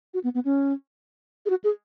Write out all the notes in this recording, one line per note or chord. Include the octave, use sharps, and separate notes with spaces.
F#4
B3
B3
C#4
G#4
F#4
G#4